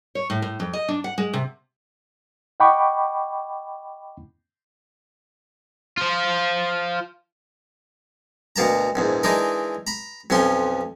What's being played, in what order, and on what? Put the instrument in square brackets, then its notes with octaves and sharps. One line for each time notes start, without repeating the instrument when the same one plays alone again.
[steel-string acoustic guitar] C#5
A2
A2
F2
D#5
D4
F#5
G#3
C3
[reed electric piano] D#5 F#5 G5 B5 C#6 D6
[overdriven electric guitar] F4 C5
[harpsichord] D2 B2 A#3 A5 A#5
A#1 E2 G#2
E3 G#3 D4 D#4 A#4
A#5 B5
B1 F2 F3 C#4 C6